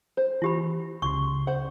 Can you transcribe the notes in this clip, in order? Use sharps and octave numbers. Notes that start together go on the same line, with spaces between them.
C5
E3 E4 G4 B5
C#2 C#3 C6 C#6
C5 F#5